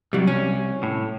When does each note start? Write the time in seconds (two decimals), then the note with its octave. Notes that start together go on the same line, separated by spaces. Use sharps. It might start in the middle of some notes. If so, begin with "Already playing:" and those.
0.13 C2 F#3 G3
0.27 C#4
0.83 A2